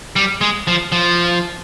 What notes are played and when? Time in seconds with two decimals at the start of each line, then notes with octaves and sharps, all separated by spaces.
0.16 G3
0.41 G#3
0.67 F3
0.92 F3